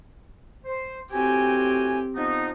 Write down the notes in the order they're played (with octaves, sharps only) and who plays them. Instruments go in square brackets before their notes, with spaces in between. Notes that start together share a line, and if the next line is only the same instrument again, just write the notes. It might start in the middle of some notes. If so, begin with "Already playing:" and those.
[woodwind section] C5
[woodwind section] A2 F#4 G#5 [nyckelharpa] C4 G4
[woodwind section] F3 B3 D#4